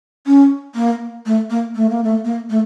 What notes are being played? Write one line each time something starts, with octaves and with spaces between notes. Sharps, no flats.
C#4
A#3
A3
A#3
A3
A#3
A3
A#3
A3